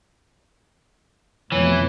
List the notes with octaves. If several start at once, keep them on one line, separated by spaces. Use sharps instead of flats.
F2 B2 E3 A3 C#5